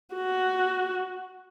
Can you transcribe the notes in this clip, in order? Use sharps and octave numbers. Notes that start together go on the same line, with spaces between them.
F#4